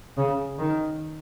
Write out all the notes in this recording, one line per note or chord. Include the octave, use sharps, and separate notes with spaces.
C#3
D#3